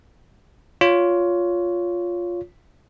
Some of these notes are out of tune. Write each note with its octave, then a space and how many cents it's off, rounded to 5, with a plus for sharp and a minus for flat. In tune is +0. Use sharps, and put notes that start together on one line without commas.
F4 +5 C#5 +20